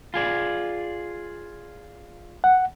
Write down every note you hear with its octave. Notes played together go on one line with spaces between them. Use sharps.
F4 G#4 D5
F#5